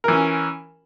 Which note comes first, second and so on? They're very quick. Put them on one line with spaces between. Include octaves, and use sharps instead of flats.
A#4 E3 C#4